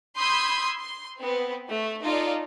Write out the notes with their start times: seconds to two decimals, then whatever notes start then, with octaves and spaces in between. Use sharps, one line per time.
0.17 B5 C6 D#6 E6 G6 G#6
0.79 C6
1.19 B3 C4
1.70 A3
2.04 D#4 F4 A4 D5